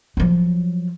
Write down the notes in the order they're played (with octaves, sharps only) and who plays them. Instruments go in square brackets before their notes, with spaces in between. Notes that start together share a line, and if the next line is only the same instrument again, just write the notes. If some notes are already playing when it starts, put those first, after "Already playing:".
[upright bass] F3 F#3